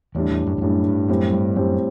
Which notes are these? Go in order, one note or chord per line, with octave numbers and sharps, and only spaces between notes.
E2 A2 G3 D4
E2
F#2
E2
F#2 A2 G3 D4
G2
F#2 A2 G3 C4
G2
F#2 A2 G3 C4